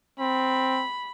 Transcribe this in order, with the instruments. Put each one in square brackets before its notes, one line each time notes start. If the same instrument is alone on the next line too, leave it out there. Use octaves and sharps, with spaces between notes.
[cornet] C4 [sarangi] B5